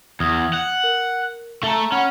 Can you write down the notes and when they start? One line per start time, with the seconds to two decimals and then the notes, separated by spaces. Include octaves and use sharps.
0.20 E2 D#6 F6 G#6
0.53 F#5
0.84 A#4
1.63 A3 A4 E5 A5 A#5
1.92 C#4 F#5 B5 F6